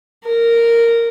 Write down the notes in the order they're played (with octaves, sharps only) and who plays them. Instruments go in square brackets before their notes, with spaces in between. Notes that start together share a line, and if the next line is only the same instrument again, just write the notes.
[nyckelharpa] A#4